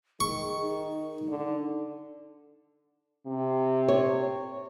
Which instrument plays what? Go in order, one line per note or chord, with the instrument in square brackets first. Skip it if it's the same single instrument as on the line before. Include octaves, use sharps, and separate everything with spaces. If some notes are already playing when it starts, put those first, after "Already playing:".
[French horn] D#3 [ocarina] G#4 [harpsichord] C#6
[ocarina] D#4
[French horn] D3
C3
[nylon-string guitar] C#5